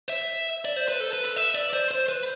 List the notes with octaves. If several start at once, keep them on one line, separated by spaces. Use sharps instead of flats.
E5
D5
C5
B4
A4
B4
B4
E5
D5
C5
C5
B4